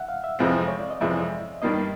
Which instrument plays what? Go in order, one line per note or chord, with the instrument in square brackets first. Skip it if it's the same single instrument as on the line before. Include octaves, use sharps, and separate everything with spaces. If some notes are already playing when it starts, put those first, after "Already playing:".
Already playing: [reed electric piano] E5 F#5
F5
E5
[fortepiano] F2 C3 E3 G#3 C4 [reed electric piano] F5
[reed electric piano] C#5
D5
D#5
[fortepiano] F2 C3 E3 G#3 C4 [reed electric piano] E5
[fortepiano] G2 D#3 G3 A#3 [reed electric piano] D#5